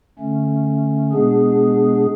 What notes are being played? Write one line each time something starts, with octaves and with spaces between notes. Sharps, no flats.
D3 A3 C#4
B2 G#3 B3 D4 G#4